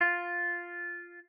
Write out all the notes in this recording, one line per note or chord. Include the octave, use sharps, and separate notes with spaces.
F4